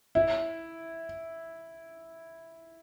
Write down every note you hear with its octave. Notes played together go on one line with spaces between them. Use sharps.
E4